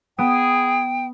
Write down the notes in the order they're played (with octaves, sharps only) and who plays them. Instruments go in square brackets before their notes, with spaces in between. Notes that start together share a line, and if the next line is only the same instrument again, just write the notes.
[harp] B3 D#6 D7 [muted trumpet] G#4 [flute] G5